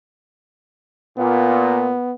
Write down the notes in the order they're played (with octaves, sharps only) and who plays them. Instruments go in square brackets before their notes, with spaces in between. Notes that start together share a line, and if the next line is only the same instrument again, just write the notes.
[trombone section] A#2 [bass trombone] B3